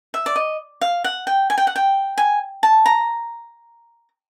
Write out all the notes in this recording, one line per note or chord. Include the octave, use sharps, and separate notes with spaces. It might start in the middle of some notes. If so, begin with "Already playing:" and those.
E5
D5
D#5
F5
F#5
G5
G#5
G5
F#5
G5
G#5
A5
A#5